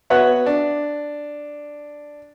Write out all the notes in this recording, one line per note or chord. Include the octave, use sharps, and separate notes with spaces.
B3 F#4 B4 C#5 E5 F#5
D4